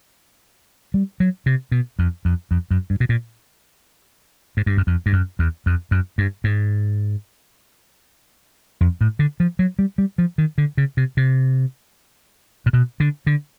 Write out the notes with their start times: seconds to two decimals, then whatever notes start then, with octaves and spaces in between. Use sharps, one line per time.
0.94 G3
1.20 F#3
1.46 C3
1.72 B2
1.99 F2
2.25 F2
2.51 F2
2.71 F#2
2.90 G2
3.00 B2
3.09 A#2
4.57 G#2
4.66 G2
4.77 F#2
4.87 F2
5.06 G2
5.13 F#2
5.39 E2
5.66 F2
5.91 F#2
6.18 G2
6.44 G#2
8.81 F2
9.01 A2
9.19 D3
9.40 F3
9.59 F#3
9.79 G3
9.98 G3
10.18 F3
10.38 D#3
10.58 D3
10.77 C#3
10.97 C3
11.17 C3
12.66 A#2
12.73 B2
13.00 D3
13.27 D3